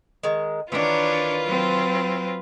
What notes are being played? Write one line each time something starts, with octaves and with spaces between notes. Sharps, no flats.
D#3 G#3
D#3 E3 D4 F4 B4 C#5
F#3 C4